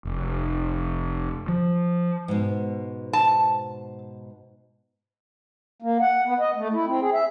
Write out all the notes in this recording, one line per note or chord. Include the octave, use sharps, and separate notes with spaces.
F1
F3
G#2 B2
A5
A#3
F#5
B3
D#5
A3
E4
C4
G#4
E5